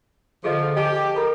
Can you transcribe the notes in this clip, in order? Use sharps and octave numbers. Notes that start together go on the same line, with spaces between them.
D3 F3 G#4 A4 D#5
G4 D#5 G#5 A5
A4 A#4 B5